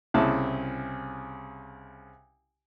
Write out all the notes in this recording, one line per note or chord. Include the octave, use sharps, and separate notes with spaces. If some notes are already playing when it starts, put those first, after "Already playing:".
C2 C#3 E4 A5